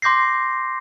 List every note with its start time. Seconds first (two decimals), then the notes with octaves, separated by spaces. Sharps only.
0.02 C6 D6 G6 A#6 C7